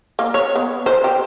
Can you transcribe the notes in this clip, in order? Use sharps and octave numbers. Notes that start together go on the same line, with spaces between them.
A#3
C#5
B3
C5
G4